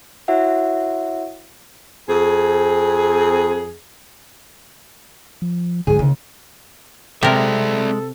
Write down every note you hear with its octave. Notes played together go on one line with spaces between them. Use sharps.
E4 F#4 C#5 E5 F#5
F2 C4 G#4
F3
G#2 D3 F3 G#4
D#2 C#3
C3 G#3 C4 A4 A#4 D5 E5